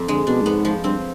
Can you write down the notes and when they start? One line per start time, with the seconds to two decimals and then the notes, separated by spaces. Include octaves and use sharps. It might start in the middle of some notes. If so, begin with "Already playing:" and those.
Already playing: F2 C4
0.08 D3 G#3
0.27 B2 D4
0.42 G2
0.46 G#2 B3
0.65 F3
0.84 G2 C4